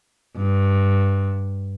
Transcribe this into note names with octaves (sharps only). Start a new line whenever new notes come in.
G2